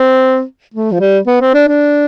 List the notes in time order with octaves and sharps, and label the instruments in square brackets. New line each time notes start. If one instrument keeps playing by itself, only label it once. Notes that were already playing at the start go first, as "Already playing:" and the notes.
Already playing: [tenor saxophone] C4
A3
F3
G3
B3
C4
D4
D4